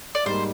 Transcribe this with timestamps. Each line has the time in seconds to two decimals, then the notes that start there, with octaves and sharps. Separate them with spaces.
0.15 D5
0.25 G#2 G3 A#3 D#4 A#4 C5